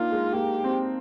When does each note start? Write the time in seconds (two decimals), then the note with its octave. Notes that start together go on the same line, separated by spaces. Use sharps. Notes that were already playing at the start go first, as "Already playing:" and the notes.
Already playing: A#3 D4 D#4 F4
0.12 G#3
0.33 A#3 G4
0.64 C4